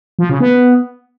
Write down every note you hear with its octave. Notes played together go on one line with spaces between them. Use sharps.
F3
C#3
B3